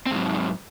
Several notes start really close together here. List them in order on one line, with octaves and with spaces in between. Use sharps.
C4 G#2 F#3